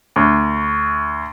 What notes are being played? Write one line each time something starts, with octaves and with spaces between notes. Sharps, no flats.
D2